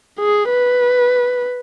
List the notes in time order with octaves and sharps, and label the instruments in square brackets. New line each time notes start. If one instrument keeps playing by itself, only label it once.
[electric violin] G#4
B4